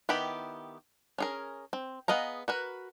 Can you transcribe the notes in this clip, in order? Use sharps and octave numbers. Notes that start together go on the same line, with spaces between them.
D#3 B3 E4 G4 B5
C#4 G#4 A#4
C4
B3 G#4 D#5 F5 A#5
F#4 A#4 B4